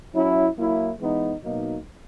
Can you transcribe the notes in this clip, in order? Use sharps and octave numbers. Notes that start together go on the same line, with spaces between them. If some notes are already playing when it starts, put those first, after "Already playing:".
F#3 C#4 E4
F#3 A#3 E4
E3 G#3 B3 D#4
B2 F#3 A#3 D#4